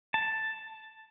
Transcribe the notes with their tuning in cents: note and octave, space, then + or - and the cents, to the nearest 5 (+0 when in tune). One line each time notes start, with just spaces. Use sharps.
A5 +5